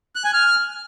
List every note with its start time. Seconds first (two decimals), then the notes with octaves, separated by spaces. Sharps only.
0.16 F#6
0.24 G#5
0.33 F6